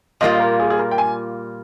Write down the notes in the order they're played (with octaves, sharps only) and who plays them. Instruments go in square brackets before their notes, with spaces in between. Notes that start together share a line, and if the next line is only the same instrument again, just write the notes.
[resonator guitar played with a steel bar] A#2 G3 A#3 F4 [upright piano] D#5
[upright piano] A#4
G#4
G#4
A#4
G5
G#5